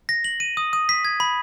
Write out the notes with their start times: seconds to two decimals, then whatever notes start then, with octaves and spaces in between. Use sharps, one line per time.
0.09 A#6
0.24 F#7
0.40 D#7
0.57 D#6
0.73 D#6
0.89 B6
1.05 G#6
1.20 B5